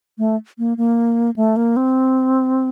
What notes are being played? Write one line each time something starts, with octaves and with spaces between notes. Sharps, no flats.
A3
A#3
A#3
A3
A#3
C4